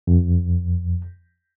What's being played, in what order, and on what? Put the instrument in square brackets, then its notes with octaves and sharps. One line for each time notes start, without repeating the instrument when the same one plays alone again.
[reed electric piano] F2